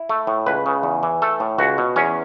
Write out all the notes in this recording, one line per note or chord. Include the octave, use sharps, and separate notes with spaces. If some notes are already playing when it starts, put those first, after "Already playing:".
Already playing: E4
A3
A2
C#2 B4
C#3
E2
E3
A3 A4
A2
C#2 F#4
B2
E2 C#4